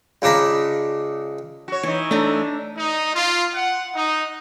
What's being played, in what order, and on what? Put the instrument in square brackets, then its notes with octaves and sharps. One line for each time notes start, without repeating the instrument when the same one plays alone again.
[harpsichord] C#2 C#3 D4 A#5 B5
[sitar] F#4 C#5
[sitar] E3 D#4 [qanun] C#5
[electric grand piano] A3 [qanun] D4 A#5
[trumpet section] D#4
F4
F#5
D#4